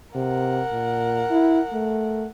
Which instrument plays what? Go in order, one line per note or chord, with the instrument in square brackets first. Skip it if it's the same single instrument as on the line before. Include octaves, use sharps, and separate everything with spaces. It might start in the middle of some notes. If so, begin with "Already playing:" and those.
[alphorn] C3 [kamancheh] A#4 F#5
[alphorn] A#2
E4
A3